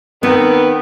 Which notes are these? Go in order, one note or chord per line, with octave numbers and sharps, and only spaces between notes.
D#3 B3 C4